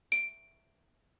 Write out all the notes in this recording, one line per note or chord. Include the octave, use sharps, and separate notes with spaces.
D7